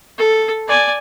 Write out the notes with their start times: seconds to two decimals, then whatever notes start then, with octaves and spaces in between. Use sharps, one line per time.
0.18 A4
0.68 D5 G#5